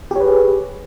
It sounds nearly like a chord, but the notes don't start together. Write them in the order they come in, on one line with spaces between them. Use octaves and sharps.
G4 C#5 B4 G#4